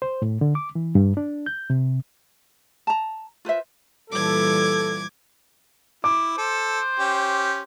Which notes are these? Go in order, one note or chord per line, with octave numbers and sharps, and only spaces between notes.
C5
A2
D3
D6
E3
G2
D4
G6
C3
A5 A#5
F4 B4 C5 E5
A#2 E3 G3 A4 D6 G#6
E4 D6
A4 C5
C#4 G4